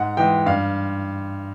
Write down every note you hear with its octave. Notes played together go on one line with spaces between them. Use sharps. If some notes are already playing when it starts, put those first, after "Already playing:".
Already playing: G#2 F#5
E3 G#3 G5
G2 F5